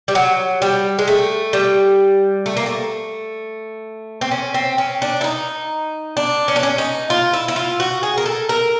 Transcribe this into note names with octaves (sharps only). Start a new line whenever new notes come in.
G3
F#3
G3
G#3
A3
G3
A3
A#3
A3
C4
C#4
C4
C#4
D4
E4
D#4
D4
C#4
D4
C#4
D#4
F4
E4
E4
F4
F#4
G#4
A#4
A4
A#4